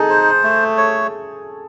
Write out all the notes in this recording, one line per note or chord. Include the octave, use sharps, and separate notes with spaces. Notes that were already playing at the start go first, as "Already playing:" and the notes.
Already playing: D#4 G#4 A4
C5
A3
C#5